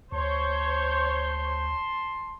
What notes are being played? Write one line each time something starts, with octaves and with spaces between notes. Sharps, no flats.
D2 C5 C#5 A5 C6 G6